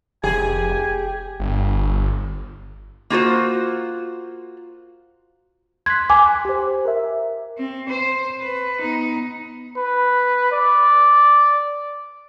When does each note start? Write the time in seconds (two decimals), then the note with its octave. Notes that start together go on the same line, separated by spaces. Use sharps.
0.24 F1 G4 G#4 G#5
1.40 G1
3.10 A#3 F4 F#4 C5
5.86 C6 F#6 G#6 B6
6.10 G#5 D6
6.45 G4 C5
6.85 A#4 E5
7.58 C4
7.89 C5
8.40 B4
8.79 B3 D#4
9.76 B4
10.52 D5